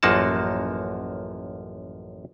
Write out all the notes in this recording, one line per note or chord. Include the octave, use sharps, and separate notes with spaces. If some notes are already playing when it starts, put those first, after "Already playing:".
A1 F#2 F3 A#3 F#4 A5